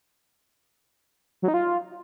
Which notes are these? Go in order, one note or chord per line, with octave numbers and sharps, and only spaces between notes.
F#3
D#4
F4